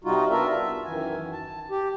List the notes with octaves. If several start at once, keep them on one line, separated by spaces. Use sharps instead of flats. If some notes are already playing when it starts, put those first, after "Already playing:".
C3 G3 D#4 F4 F#4
B3 D4 F4 A#4 E5
E5
F#2 D#3 E3 G#5
A5
G4